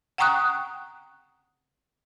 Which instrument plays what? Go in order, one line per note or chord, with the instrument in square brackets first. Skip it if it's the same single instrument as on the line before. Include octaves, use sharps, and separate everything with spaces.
[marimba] F#5 G5 A#5 C#6 D#6 F#6